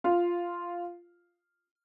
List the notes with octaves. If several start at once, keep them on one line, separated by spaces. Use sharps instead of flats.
F4 F5